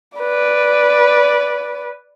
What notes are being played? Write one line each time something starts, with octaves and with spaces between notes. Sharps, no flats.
B4 D5